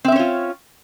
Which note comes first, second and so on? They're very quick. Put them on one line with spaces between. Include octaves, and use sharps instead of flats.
C4 E5 C#4 C#5 F4